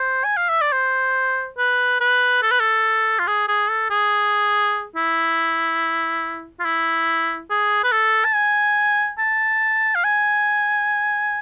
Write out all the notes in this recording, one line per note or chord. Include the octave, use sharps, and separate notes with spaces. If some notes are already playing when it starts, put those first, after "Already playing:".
Already playing: C5
G#5
F5
E5
D5
C5
B4
B4
A4
B4
A4
F4
G#4
G#4
A4
G#4
E4
F4
E4
G#4
B4
A4
A5
G#5
A5
F5
G#5